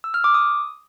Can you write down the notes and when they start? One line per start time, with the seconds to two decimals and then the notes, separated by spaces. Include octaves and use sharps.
0.04 E6
0.14 F6
0.24 D6
0.34 D#6